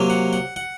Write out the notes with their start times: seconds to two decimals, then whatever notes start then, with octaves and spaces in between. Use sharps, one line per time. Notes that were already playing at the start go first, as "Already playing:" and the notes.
Already playing: C3 F#3 A#3
0.10 F#5
0.33 F#5
0.56 F#5